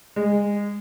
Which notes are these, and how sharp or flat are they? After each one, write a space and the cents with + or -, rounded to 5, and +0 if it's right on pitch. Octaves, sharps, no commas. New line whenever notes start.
G#3 -25